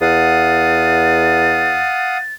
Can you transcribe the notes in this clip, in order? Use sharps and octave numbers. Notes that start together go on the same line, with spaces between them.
E2 F5 F#5 D#6 A6